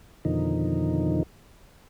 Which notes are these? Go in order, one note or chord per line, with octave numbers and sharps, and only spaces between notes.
F2 B2 D3 D#3 F3 D#4